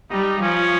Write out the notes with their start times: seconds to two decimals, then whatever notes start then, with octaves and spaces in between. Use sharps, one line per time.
0.10 G3 D#4
0.41 F3 C#4